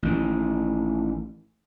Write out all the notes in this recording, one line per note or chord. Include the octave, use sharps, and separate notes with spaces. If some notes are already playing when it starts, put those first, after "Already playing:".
A1 D#3